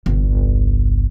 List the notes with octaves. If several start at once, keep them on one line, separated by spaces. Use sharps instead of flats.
G1 C2